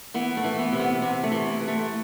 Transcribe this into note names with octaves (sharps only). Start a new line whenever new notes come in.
E3 B3
A3
E3
B3
C3
B3
C3
A3
E3
E3
A3